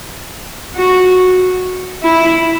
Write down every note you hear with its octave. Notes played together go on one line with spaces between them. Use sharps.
F#4
E4